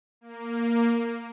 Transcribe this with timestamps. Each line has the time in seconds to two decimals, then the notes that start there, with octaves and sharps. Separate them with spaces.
0.21 A#3